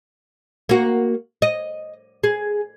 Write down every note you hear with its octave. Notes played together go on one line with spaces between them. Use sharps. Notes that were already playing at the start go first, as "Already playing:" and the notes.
A#3 F#4
D#5
G#4